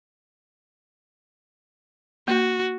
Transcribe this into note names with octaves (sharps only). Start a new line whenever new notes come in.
A#3 F#4